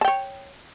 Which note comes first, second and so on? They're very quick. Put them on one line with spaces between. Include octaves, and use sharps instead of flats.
A5 G5 C#5